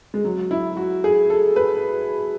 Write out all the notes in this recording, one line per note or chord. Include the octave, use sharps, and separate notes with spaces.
G#3
F#3
E4
F#4
G#4
A4
B4